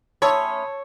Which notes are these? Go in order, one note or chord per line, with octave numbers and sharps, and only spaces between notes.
A3 C#4 C#5 A5 B5 C6 D#6 E6